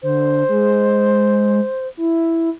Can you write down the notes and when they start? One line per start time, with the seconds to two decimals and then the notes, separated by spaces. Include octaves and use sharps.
0.03 D3 C5
0.49 G#3
1.97 E4